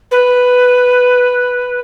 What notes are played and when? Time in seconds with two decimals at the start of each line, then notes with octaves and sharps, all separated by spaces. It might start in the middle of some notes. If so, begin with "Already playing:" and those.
0.11 B4